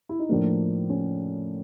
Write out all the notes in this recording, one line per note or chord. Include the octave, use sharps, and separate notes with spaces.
E4
D#4
A2 F3 A#3 D4
C#4